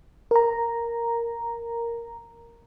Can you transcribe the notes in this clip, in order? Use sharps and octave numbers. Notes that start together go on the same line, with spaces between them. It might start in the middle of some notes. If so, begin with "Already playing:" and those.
A#4 A#5